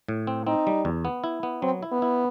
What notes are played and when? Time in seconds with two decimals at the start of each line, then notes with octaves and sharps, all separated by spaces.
0.08 A2
0.27 C4
0.47 C4 D#4
0.67 G3
0.85 E2
1.05 B3
1.24 E4
1.43 B3
1.62 F#3 C4
1.83 E4
1.92 B3
2.02 E4